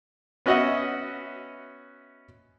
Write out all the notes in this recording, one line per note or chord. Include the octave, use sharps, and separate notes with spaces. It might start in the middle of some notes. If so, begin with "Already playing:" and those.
B3 C#4 F#4 D#5 E5 F#5